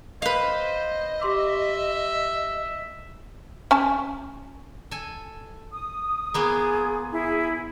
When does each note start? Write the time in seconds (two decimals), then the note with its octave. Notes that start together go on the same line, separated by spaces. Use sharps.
0.22 B4 C5 D#5 F5
1.21 G4 E5 C6 D6
3.71 C#4 G#5 A5
4.91 A4 G#5
5.72 D#6
6.34 A#3 B3 F4 G#4
7.12 E4 G#4